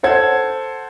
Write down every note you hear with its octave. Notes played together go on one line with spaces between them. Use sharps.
A4 C5 F#5 G#6